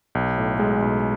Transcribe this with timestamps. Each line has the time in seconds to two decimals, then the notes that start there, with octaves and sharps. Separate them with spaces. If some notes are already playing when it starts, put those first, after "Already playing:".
0.15 B1
0.38 A2
0.59 G#3
0.82 B1